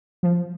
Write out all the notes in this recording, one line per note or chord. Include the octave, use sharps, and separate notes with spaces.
F3